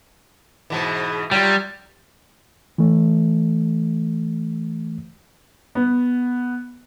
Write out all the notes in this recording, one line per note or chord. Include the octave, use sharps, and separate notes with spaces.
G#2 B2 E3
F#3 G3 F4
E3 A3
B3